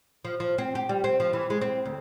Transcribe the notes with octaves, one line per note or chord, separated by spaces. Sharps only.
F3
F3
C4
G4
G3
C4
F3
E3
G#3
C4
D2